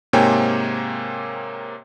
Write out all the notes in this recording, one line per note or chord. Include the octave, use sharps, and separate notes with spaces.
G#2 C3 A#3 C#5 G5 G#5